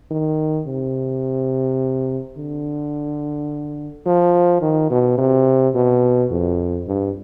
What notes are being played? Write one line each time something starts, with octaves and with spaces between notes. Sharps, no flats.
D#3
C3
D3
F3
D#3
B2
C3
B2
F2
G2